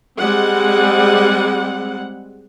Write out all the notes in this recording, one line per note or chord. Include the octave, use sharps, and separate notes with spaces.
G3 G#3 C4 F#5